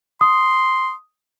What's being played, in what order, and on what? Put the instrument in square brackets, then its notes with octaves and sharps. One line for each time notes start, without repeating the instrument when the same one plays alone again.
[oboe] C6 [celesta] D#6